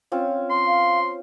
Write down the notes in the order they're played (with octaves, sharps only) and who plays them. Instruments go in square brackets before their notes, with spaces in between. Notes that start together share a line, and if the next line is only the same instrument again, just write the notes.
[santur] C4 C#4 F4
[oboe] C6
[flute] F5